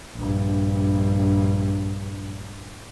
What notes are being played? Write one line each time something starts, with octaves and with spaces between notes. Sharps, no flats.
A#1 G2